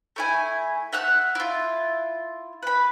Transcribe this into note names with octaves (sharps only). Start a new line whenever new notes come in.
A3 E4 G#5
E5 F#5 F6 F#6
E4 F4
B4 B5